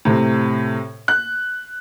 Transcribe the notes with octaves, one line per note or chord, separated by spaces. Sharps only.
A2 C3
F#6